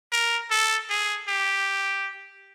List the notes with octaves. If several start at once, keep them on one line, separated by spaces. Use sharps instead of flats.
A#4
A4
G#4
G4